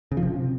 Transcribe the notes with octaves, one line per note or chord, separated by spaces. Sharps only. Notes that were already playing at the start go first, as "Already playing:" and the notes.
C#3
F3
C3